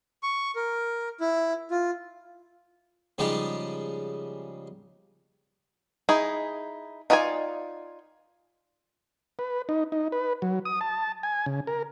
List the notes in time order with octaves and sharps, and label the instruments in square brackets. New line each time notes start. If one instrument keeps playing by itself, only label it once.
[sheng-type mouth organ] C#6
A#4
E4
F4
[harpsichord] C#3 F3 G3 G#3 D#4 G4
[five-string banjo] D#4 E4 G#4
D#4 F4 D5 D#5 G#5
[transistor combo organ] B4
D#4
D#4
B4
F#3
D#6
A5
G#5
C#3
A#4